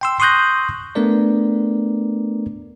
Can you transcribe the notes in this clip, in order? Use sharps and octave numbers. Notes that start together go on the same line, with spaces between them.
G5 C6 E6
C6 C#6 D#6 F#6 G6 A#6
A3 B3 D4 A#4 D5